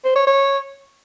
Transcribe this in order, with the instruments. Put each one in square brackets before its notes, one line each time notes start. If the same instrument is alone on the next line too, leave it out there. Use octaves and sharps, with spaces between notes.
[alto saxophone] C5
C#5
C#5